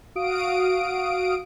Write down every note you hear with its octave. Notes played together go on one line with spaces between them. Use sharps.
F#4 F5 D#6 D7